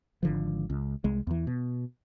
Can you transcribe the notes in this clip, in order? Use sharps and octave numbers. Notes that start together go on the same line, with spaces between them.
G#1 D3 F3
C#2
C2 G#3
E2 E3
B2